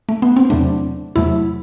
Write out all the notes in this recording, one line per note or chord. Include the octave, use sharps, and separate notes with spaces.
A3
B3
C4
E2 C3 F#3 A3 D4
E2 C3 F#3 A3 E4